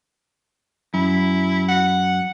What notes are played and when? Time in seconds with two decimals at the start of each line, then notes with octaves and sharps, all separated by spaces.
0.94 F#2 E4
1.69 F#5